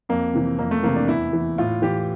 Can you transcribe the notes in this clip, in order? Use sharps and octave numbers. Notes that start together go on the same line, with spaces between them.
F2 A#3
C3 E3
F2 A#3
A3
C3 E3 A#3
D4
E2 E4
E3
A2 F4
E3 G4